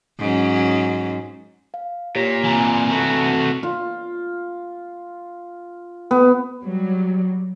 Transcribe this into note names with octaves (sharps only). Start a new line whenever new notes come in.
G#2 F#3 C#4
F5
A#2 G4 C#5
C3 E3 G#5 A#5
A3 F#4
F4
B3
F#3 G3